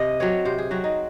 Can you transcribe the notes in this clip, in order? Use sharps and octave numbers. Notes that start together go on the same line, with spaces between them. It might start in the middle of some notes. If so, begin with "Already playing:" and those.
Already playing: C3 D#5
F#3 C4 C#5
C3 C5
G#4
F#3 C4 F#4
D#4